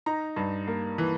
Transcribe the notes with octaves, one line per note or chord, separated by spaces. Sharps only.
D#4 A#5
G2
A#3
E3